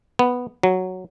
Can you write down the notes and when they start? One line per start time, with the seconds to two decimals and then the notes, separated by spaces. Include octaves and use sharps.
0.19 B3
0.63 F#3